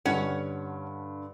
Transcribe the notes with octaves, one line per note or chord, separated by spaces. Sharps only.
G2 D3 C#4 C#5 F#5